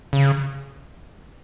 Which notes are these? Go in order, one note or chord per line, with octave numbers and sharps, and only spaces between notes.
C#3